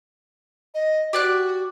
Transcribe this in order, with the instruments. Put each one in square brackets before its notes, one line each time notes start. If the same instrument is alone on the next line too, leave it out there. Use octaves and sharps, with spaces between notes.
[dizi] D#5
[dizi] F#4 [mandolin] G4 D5 F#6